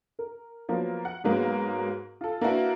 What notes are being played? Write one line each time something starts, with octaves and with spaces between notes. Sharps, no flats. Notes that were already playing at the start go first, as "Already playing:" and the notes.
A#4
F3 F#3 A#3 B3
F#5
G#2 F#3 G#3 A#3 B3
F4 A4
A#3 D4 E4 F#4 B4